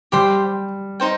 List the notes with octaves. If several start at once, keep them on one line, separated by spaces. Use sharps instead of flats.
G3 G4 C5 G5 C6
D#4 C5 G5